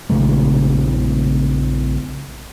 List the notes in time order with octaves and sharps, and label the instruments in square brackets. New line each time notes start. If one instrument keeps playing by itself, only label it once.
[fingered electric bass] A#1 C#3 G#3 A3